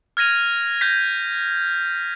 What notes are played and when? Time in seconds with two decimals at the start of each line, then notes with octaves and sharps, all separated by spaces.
0.17 F6 G#6 A#6 D#7 F7
0.81 G6 A#6 B6